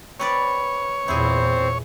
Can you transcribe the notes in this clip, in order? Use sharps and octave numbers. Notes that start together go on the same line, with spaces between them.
C4 B4 C#5 D5
E2 A#2 C4 E4 G#4 C5